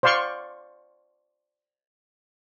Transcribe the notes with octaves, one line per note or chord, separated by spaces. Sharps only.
C5 D5 F5 C6 C#6